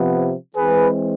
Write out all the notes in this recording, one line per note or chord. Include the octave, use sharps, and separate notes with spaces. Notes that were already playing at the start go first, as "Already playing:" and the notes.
Already playing: C3 F3 B3
E3 G#3 C4 G#4 B4